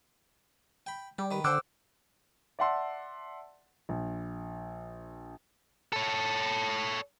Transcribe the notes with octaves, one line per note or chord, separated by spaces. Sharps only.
G5 B5
G3 G4
D#3 B4
D3 C5 F#5 G5 D6 E6 F#6
D5 E5 F#5 A5 C6 E6
A#1
A4 C#5